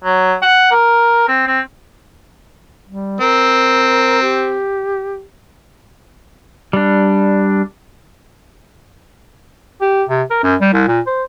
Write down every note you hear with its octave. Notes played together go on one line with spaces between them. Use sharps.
F#3
F#5
A#4
C4
C4
G3
C4 A#4
G4
G3 D4
G4
C3
A#4
F#2
G3
C2
A#2
C5